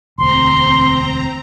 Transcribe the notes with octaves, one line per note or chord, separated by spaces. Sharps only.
E1 D2 C4 A#5 C6